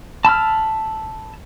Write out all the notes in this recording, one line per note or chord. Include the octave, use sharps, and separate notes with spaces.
A5 B5 E6 F6